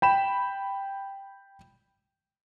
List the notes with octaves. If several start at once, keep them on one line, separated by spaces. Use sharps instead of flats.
G5 B5 E7